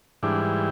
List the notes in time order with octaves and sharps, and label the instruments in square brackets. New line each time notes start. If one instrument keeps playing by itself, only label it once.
[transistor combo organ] G#2 E3 G3 D4